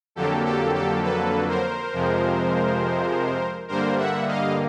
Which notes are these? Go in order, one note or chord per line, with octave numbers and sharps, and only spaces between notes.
F2 D3 F#3 A#3 G4 A4
G4 A4
G4 A4
A4 B4
A#4 C5
F2 C3 F3 G#3
G2 D3 G3 A#3 A#4 C5
E5 F#5
D#5 F5